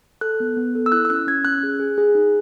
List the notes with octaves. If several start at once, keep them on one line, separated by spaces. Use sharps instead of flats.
A4 F#6
B3
B3
A4
E6
E4 F#6
E6
C#4 F#6
C#4 G#6
C#4 F#6
G#4
G#4
G#4
D#4